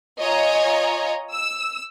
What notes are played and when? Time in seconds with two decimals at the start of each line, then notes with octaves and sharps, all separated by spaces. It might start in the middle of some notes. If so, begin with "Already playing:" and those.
0.19 F4 C#5 D#5 G#5 A#5
1.32 E6